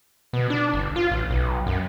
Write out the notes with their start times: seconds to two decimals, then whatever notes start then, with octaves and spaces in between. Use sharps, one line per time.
0.33 B2
0.50 D4
0.74 G1
0.96 F4
1.11 A1
1.30 B1
1.67 F#2